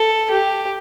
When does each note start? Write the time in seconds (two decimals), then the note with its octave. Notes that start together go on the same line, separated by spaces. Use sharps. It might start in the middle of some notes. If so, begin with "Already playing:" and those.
Already playing: A4
0.30 G4